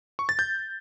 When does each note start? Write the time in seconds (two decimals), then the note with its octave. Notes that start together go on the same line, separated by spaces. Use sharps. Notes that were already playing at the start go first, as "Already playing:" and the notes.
0.19 C#6
0.29 A6
0.39 G6